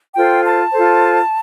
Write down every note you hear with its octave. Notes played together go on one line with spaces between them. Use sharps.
F4 A4 C5 G5
A5
F4 A4 C5